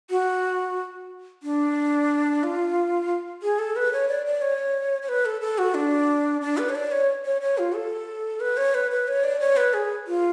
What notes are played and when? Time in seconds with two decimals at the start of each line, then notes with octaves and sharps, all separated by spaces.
0.10 F#4
1.43 D4
2.43 F4
3.43 G#4
3.59 A4
3.76 B4
3.92 C#5
4.08 D5
4.26 D5
4.42 C#5
5.02 C#5
5.09 B4
5.25 A4
5.41 A4
5.58 F#4
5.74 D4
6.41 D4
6.58 B4
6.69 C#5
6.75 D5
6.91 C#5
7.25 C#5
7.41 C#5
7.58 F4
7.75 A4
8.40 B4
8.57 C#5
8.74 B4
8.91 B4
9.08 C#5
9.24 D5
9.40 C#5
9.57 B4
9.74 G#4
10.07 F4